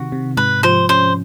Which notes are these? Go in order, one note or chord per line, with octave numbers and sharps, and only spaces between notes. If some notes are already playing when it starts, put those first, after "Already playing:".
Already playing: C3 D#3 F#4
C3
G#2 B4
F3 C5
C#4 C5